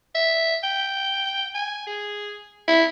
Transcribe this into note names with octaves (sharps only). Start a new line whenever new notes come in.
E5
G5
G#5
G#4
E4